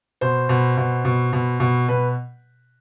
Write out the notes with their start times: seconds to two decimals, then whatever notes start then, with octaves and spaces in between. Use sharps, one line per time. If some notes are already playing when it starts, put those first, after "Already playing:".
0.21 B2 C5
0.49 B2
0.77 B2
1.05 B2
1.33 B2
1.60 B2
1.88 B2 B4